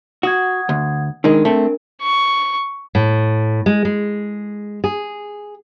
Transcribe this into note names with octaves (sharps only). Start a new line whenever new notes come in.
F#4 F#5 D#6 G#6
D2
D#3 G#3 D4 D#4 A#4
A3 C4
C#6
A2
G#3
G#3
G#4